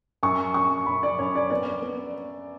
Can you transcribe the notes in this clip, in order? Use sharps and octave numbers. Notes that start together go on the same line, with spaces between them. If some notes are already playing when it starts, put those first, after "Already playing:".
F#2 C#6
F#2 C#6
F#2 B5
D5
F#2 C#5
D5
B3 D5
B3